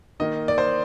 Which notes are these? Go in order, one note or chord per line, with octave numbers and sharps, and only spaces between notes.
D#3 A#3 D#5
D5
C5